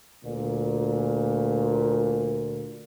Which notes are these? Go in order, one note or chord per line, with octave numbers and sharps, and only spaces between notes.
D2 A#2